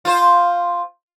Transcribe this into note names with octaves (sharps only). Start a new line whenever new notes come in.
F4 C5